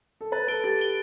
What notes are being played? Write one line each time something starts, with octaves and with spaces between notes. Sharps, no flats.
A4
B4 A6
A4 D7 G7
G4 A6
D7 G7